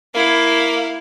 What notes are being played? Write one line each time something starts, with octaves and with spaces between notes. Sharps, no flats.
A#3 E4 F5